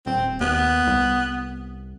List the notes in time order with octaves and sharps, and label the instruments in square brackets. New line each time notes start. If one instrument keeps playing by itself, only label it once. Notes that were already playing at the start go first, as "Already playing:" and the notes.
[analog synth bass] D#1 [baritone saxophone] C4
[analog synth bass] D#2 [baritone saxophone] B3
[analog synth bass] C2